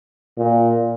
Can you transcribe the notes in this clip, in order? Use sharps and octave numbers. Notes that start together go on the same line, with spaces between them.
A#2